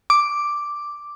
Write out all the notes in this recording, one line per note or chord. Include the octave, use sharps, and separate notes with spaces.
D6